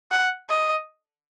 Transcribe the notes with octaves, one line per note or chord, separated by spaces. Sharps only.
F#5
D#5